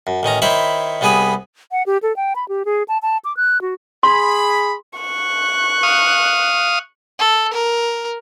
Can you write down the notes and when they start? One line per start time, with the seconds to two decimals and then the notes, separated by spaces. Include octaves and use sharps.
0.07 F#2
0.23 A1 D#3 C#4 A#5
0.42 D#3 E4 C5 C#5 B5 C#6
1.01 C2 G3 B3 G#4 G#5 B5
1.72 F#5
1.86 G4
2.03 A4
2.16 G5
2.36 B5
2.49 G4
2.65 G#4
2.88 A5
3.02 A5
3.25 D6
3.37 F#6
3.61 F#4
4.03 G#4 B5 C6
4.99 C#6 F#6
5.83 F5 D#6
7.19 A4
7.53 A#4